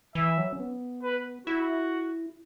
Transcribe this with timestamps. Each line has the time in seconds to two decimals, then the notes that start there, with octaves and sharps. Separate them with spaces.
0.15 E3 E5
0.38 F#3
0.53 C#4
0.60 B3
1.03 B4
1.47 E4 F#4